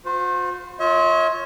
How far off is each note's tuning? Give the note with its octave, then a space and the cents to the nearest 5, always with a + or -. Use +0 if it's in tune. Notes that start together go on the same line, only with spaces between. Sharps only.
F4 +45 C5 -25
F4 +5 C#5 +0 E5 -45